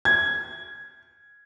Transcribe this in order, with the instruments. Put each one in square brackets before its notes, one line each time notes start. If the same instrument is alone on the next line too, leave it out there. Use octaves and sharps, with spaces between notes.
[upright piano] G#6